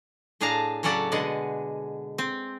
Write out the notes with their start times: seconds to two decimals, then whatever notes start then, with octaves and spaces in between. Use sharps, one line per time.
0.41 A2 D4 G#4 F5 A5 A#5
0.83 C#3 F#3 C#4 A4 D5 F#5
1.12 B2 D3 G#3 G#4 F#5
2.18 C4